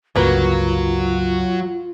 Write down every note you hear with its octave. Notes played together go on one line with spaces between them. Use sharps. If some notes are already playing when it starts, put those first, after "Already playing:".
G1 C#2 F#3 A#3 F4 B4